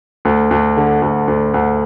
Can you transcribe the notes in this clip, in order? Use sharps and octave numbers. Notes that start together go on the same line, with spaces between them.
D2
D2
D3
D2
D2
D2